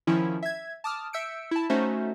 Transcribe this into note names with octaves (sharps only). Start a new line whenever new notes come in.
D#3 F3 C#4 E4
E5 G#6
A5 D6 D#6 F6
E5 E6 G6 C#7 D7
E4 A5
A3 C#4 D#4 F#4 C5 E5